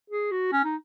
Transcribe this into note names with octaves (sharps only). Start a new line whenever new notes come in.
G#4
F#4
C#4
D#4